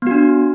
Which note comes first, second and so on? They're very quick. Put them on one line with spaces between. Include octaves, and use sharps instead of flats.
B3 F#4 D4